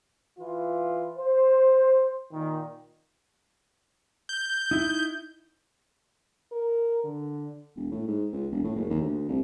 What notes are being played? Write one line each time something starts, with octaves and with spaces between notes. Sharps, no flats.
E3 F4
C5
A#2 D#3
G6
D#4 E4
A#4
D3
E1
A2
G#2
C#2
E1
A2
F#1
D#2
D2
C2